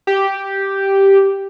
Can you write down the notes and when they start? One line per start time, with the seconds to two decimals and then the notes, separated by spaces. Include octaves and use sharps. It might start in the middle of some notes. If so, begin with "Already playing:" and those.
0.07 G4